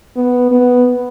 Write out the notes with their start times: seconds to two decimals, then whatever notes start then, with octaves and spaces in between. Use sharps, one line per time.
0.16 B3
0.51 B3